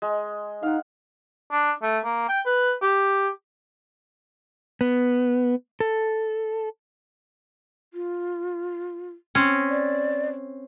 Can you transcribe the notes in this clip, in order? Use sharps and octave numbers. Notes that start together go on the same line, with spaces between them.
G#3
D#4 F5 F#5
D4
A3
A#3
G5
B4
G4
B3
A4
F4
C4 C#4
D5